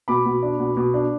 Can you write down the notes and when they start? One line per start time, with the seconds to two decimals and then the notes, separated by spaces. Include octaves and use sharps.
0.08 B2 B5 D6
0.26 B2
0.43 D4
0.60 B2
0.77 B2
0.94 D4